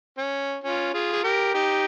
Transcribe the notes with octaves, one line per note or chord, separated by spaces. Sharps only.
C#4
C#4 F4
F4 G#4
G#4
G4 A#4
D#4 G4